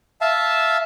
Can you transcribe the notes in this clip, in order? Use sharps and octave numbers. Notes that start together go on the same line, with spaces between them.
E5 F5 A5